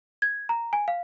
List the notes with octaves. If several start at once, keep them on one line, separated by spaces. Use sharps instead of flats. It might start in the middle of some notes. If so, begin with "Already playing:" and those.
G#6
A#5
G#5
F5